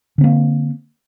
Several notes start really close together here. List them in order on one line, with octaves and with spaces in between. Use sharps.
D3 C4 A#3